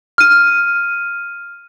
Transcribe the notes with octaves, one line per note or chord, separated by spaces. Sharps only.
F6 D#7